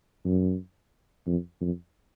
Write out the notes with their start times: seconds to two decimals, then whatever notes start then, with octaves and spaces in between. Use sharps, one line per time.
0.25 F#2
1.27 F2
1.61 F2